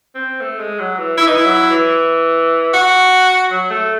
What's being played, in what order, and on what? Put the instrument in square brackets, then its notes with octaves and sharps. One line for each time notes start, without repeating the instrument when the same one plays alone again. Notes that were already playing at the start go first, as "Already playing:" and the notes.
[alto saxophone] C4
A3
G#3
F#3
E3
[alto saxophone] E3 [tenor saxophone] E4
[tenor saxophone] D#4
E4
[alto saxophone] F#3
E3
[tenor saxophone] F#4
[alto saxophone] F#3
A3